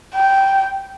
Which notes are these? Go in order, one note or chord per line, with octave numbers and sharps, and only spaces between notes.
G5